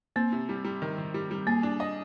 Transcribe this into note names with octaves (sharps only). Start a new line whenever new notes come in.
A#3 C4
C3
G3
G3
D#3
D#3
G3
G3
A#3 G#4
D4
D#5